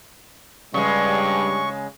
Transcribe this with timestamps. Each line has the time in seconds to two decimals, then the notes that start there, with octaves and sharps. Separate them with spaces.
0.74 G2 C#3 G3 G#3 C#6